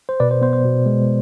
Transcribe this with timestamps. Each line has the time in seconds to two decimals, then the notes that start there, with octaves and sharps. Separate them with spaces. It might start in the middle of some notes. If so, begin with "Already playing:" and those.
0.09 C5
0.20 B2 B4 D5
0.31 C5
0.42 B3 C5
0.53 C5
0.65 B2
0.86 G#3